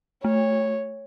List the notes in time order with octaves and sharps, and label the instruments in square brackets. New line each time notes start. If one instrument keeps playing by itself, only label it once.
[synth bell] A3 [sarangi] C#5